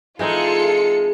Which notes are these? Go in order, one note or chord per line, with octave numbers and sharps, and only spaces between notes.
E3 G#3 C4 D#4 F4 A4 C#7